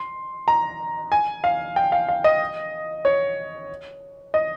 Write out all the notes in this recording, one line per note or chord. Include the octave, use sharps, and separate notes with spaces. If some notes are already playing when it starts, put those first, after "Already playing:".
Already playing: C6
A#5
G#5
F5
G5
F5
F5
D#5
C#5
D#5